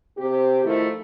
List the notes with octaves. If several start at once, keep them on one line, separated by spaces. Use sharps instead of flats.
C3 C4 G4
D#3 F3 A3 D#4 E4